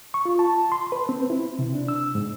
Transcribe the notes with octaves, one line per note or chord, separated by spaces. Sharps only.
C#6
F4
A5
C6
B4
C4
E4
C3
D4
E6
G#2